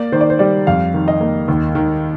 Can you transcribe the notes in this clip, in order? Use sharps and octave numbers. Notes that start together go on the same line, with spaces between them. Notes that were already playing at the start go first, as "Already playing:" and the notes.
Already playing: A#3 D5
D#3 C5
D5
C5
G3 D5
F2 F5
D#3
D#5
A#3
D#2
D#3